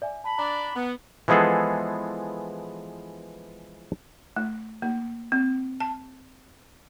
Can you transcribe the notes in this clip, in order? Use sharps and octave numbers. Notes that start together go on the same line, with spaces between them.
D5 E5 G#5
A5 B5
D4 D5 A#5
B3
E3 F3 G#3 B3 G#4 A4
A3
A#3
C4
A5